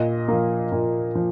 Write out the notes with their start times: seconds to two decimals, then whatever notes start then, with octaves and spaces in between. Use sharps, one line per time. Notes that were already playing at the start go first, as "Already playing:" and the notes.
Already playing: A#2 D#5
0.28 F3 A#3
0.72 A#2
1.15 F3